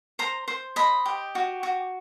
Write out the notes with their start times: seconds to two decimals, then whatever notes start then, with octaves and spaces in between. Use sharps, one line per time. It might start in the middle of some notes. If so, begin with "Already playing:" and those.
0.19 C5 A#5
0.48 C5
0.76 D#5 B5
1.06 G4
1.35 F#4
1.63 F#4